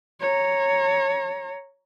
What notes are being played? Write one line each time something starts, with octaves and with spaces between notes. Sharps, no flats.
C#5 A#5